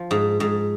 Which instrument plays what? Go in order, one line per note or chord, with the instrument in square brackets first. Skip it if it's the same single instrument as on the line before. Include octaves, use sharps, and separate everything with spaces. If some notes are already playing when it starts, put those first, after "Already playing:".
Already playing: [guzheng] F3
G#2
G#2